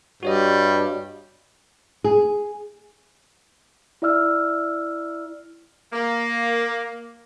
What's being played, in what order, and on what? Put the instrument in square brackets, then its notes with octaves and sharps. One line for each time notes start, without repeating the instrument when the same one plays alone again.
[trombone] G2 [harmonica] G3 [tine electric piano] F#4 C#5 D#5
[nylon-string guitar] G#4
[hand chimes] E4 D5 E5 E6 F6
[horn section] A#3